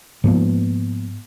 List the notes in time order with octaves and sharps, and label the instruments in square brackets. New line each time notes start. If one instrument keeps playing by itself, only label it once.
[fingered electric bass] G#2 F3 A#3 B3